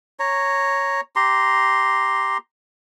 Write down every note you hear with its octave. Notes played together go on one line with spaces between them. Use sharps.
C#5 A#5
G4 A#5 C6